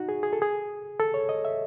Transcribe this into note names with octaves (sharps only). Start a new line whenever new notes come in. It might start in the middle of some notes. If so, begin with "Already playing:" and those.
Already playing: D#4 F#4
G#4
G#4
A4
G#4
A4
C#5
D#5
E5